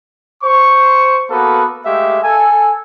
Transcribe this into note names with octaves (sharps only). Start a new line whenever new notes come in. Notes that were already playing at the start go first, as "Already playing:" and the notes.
C5 C#6
A#3 B3 F#4 A4 B4
G#3 A3 G4 E5 F5
A4 G#5